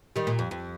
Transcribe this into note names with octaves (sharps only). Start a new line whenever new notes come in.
D#3 G3
A#2
F2
F2